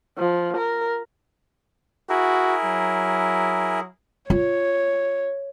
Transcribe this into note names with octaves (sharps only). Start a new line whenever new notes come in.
F3
A#4
E4 F#4 G#4 A#4
F#3
F4 C#5